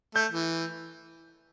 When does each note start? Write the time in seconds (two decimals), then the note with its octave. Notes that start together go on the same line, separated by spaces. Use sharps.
0.15 A3 G6
0.32 E3